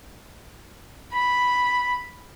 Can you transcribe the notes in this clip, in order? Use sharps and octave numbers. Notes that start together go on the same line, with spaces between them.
B5